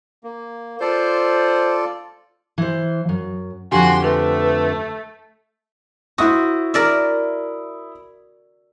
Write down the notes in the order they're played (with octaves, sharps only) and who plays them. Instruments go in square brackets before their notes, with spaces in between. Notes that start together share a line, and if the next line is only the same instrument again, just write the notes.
[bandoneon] A#3
[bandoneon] F4 A4 D5 [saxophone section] C5
[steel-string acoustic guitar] E3 C5
F#2
[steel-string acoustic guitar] F2 D3 G4 [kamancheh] F#4 C6 [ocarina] G#5
[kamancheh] A3 [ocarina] B4
[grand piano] E4 D#6 [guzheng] F#4 C5
[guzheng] A#4 D5 E5